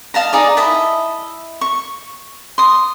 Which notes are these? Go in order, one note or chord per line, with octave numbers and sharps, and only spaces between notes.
D#5 F5 A5 A#5
D#4 G#4 D5
E4 D#5 E5 A5
C#6
C6 D#6